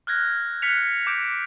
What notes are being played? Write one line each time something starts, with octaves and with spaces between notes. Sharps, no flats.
F6 F#6 G#6 A#6
F6 F#6 B6 C#7 F7
D6 G6 D7